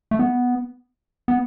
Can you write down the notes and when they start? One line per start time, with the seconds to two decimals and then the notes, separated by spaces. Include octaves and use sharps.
0.11 A3
0.19 B3
1.28 B3